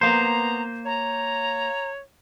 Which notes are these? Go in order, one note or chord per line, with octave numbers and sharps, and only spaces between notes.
A#3 B3 C5 A#5
C#5 A#5